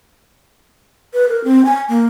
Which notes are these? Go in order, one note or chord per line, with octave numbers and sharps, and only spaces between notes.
B4
A#4
C4
G#5
A#3